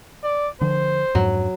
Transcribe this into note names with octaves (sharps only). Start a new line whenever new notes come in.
D5
D3 F3 C5
F2 G#2 F#3